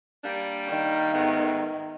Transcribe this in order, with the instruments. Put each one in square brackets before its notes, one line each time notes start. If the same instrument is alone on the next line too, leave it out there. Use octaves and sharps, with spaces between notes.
[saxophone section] G3 A#3 D4
[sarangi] D#3
[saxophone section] G#2 A3 B3